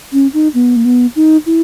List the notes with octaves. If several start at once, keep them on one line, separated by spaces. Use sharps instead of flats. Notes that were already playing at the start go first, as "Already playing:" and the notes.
C#4
D#4
B3
A#3
B3
D#4
E4